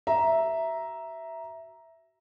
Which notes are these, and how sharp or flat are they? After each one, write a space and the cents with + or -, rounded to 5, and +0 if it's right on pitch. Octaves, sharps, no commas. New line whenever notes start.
F#4 +30 E5 +0 A#5 +5